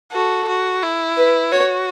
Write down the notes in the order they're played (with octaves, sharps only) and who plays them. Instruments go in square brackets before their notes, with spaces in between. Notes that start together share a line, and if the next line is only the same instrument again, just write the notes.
[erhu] F#4 [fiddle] A4
[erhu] F#4
E4
[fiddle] B4
[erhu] F#4 [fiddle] C#5